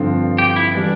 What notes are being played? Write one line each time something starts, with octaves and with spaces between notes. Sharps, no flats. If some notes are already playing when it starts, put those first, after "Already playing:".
Already playing: G2 D3 F3 C4
G4
E4
E3 G3 D4